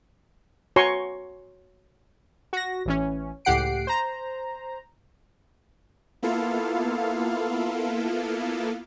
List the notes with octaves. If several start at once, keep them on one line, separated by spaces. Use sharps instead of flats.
F#4 C#5 G#5 A#5 C6 C#6
F#4 A#6
A1 E3 C#4
C#2 A2 G4 F#5 C7 D7
C5 A#5
A#3 B3 E4 F4 A4 F5